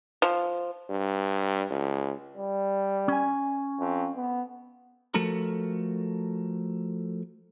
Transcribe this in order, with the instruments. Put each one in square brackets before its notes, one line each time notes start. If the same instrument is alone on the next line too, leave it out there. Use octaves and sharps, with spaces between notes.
[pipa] F3
[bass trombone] G2
C#2
[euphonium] G3
[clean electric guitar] C#4 G#5
[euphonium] F2
B3
[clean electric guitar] F3 A3 F#4 A4 A#4